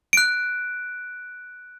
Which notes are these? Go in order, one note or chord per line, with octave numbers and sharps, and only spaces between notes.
F#6 D7